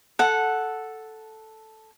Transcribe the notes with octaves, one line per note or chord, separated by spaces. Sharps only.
A4 F#5